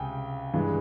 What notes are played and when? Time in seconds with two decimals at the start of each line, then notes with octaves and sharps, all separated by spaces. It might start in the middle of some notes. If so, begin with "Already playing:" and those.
Already playing: C#2 C3 G5 G#5
0.54 G2 E3 G#3